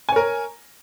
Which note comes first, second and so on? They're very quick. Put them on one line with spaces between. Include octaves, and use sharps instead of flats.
G#5 C#5 A#4